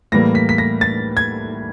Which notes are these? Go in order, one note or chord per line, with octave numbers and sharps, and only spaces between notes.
A2 E3 G3 A#3 A#6
B6
B6
A#6
A6
G#6